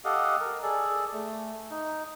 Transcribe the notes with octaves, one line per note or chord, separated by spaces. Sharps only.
G4 A4 D#5 F5 F#5
A#4
G#4 A4 D5
A3
D#4